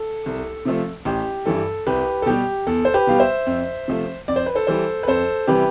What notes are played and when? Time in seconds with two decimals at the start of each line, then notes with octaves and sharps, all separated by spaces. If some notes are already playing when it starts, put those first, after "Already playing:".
Already playing: A4
0.26 C2
0.65 C3 F3 A3
1.05 A1 G4
1.46 G2 E3 G3 A4
1.87 C2 G4 B4
2.22 A4
2.26 B2 G3 G4
2.67 E2 A4
2.85 C5
2.94 G4 B4
3.07 B2 G3 F5
3.20 C5 E5
3.46 F2
3.88 C3 F3 A3
4.28 F2 D5
4.36 C5
4.46 B4
4.55 A4 C5
4.67 E3 G3 A4 C5
5.03 B4
5.07 F2 A4 C5
5.47 C3 E3 G3 G4 B4